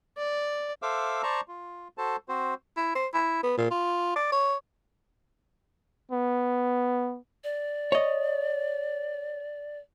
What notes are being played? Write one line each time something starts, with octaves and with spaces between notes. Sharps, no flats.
D5
A4 C5 E5 F5 D6 E6
C5 D5 A5 A#5 C#6
F4
F#4 A4 C5 A5
C4 F#4 C5
E4
C5
E4
B3
A#2
F4
D5
C#5
B3
D5
C#5 D#5